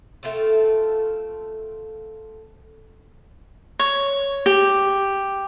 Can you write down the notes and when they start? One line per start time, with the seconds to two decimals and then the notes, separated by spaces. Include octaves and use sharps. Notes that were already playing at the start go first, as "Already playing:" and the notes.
0.23 A3 C4 F4 A4
3.79 C#5
4.46 G4